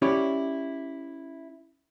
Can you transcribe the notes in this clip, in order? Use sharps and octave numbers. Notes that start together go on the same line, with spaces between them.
C#4 E4 G4 C#5 D5